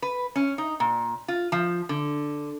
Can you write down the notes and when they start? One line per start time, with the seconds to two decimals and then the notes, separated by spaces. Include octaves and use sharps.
0.02 B4
0.36 C#4
0.58 D#4
0.80 A#2
1.28 F4
1.52 F3
1.89 D3